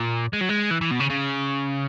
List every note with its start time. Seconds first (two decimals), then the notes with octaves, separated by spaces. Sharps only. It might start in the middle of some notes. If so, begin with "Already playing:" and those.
Already playing: A#2
0.33 G#3
0.41 F#3
0.49 G#3
0.71 E3
0.81 E3
0.91 B2
1.00 C#3
1.10 C#3